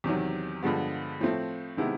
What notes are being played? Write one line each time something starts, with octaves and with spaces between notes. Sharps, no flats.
E2 C3 D#3 F#3
G2 D3 F3 G#3 B3
A2 F3 A3 C4
C3 D#3 G#3 B3 E4